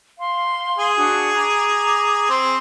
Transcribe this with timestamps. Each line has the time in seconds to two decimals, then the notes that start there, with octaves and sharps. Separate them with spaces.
0.18 F5 C6
0.78 G#4
0.95 D4 F#4 D#6
1.36 A#5 D6
2.30 C4